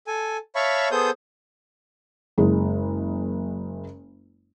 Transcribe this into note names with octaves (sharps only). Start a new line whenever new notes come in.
A4 G#5
C#5 E5 F5 A5 B5 C#6
B3 G#4 A4 C5 D#6 G6
F#1 G#3